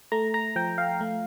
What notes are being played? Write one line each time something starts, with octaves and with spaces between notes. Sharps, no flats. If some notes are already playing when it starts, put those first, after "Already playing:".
A3 A#5
A#5
F3 G5
F5
A3